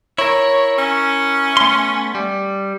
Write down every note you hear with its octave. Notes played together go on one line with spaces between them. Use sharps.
E4 A#4 C#5
C#4
A3 B3 C6
G3